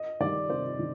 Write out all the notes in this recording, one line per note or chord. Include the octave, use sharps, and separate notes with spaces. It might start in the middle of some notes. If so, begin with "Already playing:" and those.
Already playing: D#5
D#3 G3 D5
C3 C5
D#3